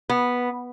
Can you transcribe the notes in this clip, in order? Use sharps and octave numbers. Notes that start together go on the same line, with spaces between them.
B3